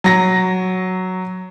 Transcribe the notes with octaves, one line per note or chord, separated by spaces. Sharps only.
F#3 A#6